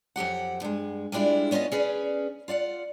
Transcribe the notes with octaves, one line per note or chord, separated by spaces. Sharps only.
F2 F#3 G4 F#5
G2 G#3
G3 G#3 D4 E4 F4
B3 C#4 F4 C#5 D#5
C#4 G#4 B4 D5
F4 D5 F5 F#5